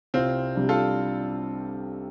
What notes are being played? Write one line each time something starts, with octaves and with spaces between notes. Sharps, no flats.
C2 C4 F4
C3 G3 D4
F4 A4